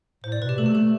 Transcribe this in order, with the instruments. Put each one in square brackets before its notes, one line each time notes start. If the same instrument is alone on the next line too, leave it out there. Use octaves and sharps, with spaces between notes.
[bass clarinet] A2 [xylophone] C5
[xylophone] D5
[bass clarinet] B2 [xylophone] B4
[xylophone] G4
[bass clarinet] A3 [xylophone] A4
[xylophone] G4
[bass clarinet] A3 [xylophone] A4